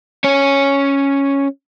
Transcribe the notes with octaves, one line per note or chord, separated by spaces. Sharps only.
C#4 C#5